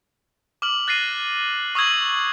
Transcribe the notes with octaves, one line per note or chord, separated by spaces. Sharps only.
D6 F6 F#7
F#6 A6 A#6 C7 D#7
C#6 D#6 E6 G#6 F#7